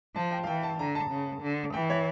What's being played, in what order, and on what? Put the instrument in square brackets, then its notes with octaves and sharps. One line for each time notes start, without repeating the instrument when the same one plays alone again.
[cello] F3 [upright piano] A5
[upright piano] G5
F5
[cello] E3 [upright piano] G5
[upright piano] A5
[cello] D3 [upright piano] A#5
[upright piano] A5
[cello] C#3
D3
[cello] E3 [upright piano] G5
[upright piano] C#5